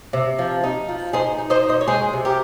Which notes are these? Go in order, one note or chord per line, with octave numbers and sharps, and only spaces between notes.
C3
F3
D#4
F3
D#4 G#4 C5
D#4
C5 D#5
D#4
C5 D#5
C#5
G#3 G#4 C5
C3
G4 A#4